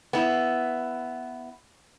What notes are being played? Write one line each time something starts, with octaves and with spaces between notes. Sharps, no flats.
B3 E4